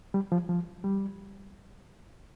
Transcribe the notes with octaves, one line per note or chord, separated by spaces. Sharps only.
G3
F3
F3
G3